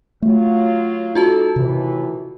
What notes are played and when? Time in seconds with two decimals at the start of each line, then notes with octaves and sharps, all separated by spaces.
0.22 F#3 A3 F4
1.15 D#4 F4 F#4 A4 A5
1.56 D#2 A2 C3 E3